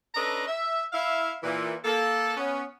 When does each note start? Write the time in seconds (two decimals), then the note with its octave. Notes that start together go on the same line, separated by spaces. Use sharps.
0.15 C#4 D4 A4 B4 D#5 A#5
0.48 E5
0.93 E4 E5 F5
1.44 A#2 E3
1.85 A#3 A4
2.37 B3 C#4